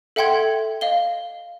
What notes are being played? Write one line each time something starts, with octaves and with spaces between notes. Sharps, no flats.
A4 E5 F#5 G5 C6 G#6
D#5 F5 G7